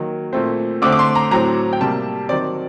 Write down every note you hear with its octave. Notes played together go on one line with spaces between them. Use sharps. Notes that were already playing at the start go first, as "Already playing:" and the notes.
Already playing: D#3 F#3 A#3
A#2 A3 C4
D3 A3 C4 D6
D6
C6
A#5
A2 F#3 C4 A#5
G5
C3 G3 A#3 A5
D#3 F#3 C4 D5